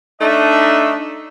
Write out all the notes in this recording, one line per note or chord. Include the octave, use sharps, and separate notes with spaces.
A3 D4 D#4 D#5 E5